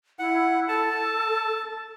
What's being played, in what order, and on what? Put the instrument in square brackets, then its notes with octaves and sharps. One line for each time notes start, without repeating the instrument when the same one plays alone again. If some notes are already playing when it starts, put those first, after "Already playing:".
[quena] E4 [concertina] F#5
[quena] A4 [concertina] A5